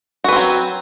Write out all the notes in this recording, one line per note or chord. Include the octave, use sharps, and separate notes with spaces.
F#3 C4 F#4 B4